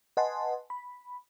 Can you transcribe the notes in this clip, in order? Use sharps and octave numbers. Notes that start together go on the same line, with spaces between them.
B4 D#5 F#5 G#5 A5 C6
B5